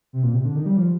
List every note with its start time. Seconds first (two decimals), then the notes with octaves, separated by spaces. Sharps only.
0.13 C3
0.23 A#2
0.34 C3
0.44 D3
0.55 D#3
0.66 G3
0.77 F3